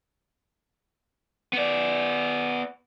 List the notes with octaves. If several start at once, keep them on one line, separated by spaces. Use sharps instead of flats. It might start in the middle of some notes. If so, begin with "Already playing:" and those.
B3 D5